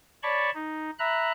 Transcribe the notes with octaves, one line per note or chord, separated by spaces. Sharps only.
C#5 D5 A5 B5 C#6
D#4
E5 A#5 B5 F#6